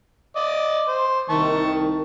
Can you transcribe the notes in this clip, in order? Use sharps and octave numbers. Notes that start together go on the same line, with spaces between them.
D5 D#5
C5
C2 D#3 A5 C#6